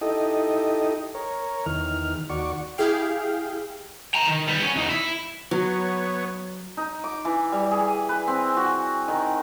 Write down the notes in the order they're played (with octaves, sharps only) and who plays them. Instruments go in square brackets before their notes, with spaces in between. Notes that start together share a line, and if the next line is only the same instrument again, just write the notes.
[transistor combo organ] D#4 E4 G4 A4 D#5
A#4 C#5
E2 D#3 F6
D#2 F#4 D5 C#6
[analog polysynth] E4 G4 G#4 F5 G5
[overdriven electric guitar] G5 A#5
D#3
G3 B3
C#4
E2 D#4
E4
[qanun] F#3 [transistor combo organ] B3 C#5
[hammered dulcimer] D#4
D6
E3
G3
G#4
B4
C4
F#4
D#3